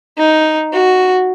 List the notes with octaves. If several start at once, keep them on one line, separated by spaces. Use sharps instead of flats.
D#4
F#4